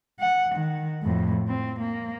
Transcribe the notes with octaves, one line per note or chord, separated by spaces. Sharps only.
F#5
D#3
F2 A2
C4
A#3